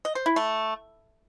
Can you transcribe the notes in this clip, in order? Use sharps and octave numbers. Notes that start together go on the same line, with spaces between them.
D#5
C5
E4
A3